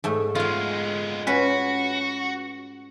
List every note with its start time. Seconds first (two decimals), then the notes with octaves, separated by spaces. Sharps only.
0.04 G#2 A3
0.35 G#3 B3 F4 F5
1.27 C#4 F#4 B4